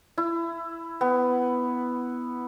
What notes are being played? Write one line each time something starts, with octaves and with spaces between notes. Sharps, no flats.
E4
B3